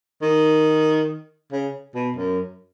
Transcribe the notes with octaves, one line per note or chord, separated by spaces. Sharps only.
D#3
C#3
B2
F#2